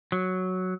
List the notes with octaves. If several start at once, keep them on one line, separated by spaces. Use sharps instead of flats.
F#3